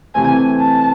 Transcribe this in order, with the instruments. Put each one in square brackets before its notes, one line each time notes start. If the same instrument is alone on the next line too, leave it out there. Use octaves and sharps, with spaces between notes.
[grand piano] C3 E3 A3 C4 [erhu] G#5
[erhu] A5